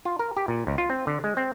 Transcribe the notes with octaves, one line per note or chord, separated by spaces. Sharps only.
F4
A#4
G4
A#2
C#2
F4
C4
D3
G#3
C4